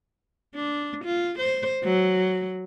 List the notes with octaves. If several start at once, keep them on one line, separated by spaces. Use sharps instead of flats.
D4
F4
C5
F#3